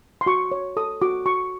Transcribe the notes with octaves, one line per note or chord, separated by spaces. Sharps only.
C6
F#4 C#6
C#5
A4 D#6
F#4 D6
F#4 C#6